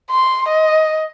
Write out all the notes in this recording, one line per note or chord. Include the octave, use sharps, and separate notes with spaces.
C6
D#5